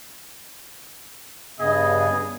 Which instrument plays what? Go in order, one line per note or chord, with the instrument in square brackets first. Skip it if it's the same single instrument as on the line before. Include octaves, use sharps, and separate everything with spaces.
[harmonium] G2 C#3 B3 [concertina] G#4 [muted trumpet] D#5